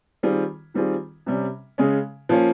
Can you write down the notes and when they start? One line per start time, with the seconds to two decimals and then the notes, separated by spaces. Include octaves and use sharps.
0.23 D#3 G3 C4 F4 G#4
0.74 D#3 G3 C4 F4 G#4
1.26 C3 G3 C#4
1.78 C#3 G#3 C#4
2.29 F3 A#3 C#4 F4